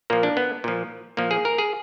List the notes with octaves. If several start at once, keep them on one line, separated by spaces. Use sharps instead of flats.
A#2 F3 A#3
D4
B3
A#2 F3
A#2 F3 A#3
G#4
A#4
G#4